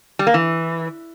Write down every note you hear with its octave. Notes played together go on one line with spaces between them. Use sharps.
G3
A#3
E3